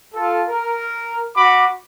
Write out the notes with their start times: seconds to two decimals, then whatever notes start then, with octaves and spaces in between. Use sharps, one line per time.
0.14 F4 A4
0.48 A#4
1.34 F#4 B5 D6